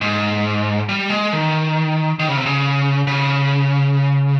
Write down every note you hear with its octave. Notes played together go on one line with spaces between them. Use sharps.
G#2
G3
G#3
D#3
D#3
C#3
C3
C#3
C#3